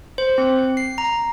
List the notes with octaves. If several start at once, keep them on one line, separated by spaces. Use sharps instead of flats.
C5
C4
C7
A#5